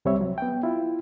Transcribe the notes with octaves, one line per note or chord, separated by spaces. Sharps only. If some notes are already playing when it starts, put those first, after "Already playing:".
C2 G3 C4 C#5 E5
F#3
B3 G5
E4 F4